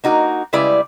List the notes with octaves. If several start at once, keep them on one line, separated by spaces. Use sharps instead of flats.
A#3 D#4 F#4 A4 A#4
C#3 G3 G#3 E4 B4 D5